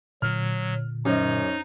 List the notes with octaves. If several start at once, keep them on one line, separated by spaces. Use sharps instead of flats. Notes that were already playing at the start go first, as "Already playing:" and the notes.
A#2 D3 F#3 F6
F#2 C#4 D#4 C5 D#5